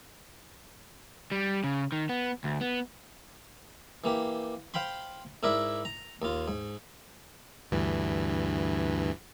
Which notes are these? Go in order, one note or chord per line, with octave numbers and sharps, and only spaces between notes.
G3
C#3
D#3
B3
D2
B3
E3 A#3 G4
C5 F5 G5 B5 C6
G#2 E4 A#4 D5 E5
A#5
D#2 F4
G#2
D2 G2 E3